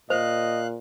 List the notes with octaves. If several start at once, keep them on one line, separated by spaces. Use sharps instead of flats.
A#2 C5 D#5 F5 F#6